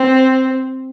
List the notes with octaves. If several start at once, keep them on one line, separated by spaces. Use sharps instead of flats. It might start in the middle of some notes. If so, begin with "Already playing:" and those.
Already playing: C4